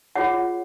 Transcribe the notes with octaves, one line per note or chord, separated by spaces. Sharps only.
F4 G#4 C#5 F#5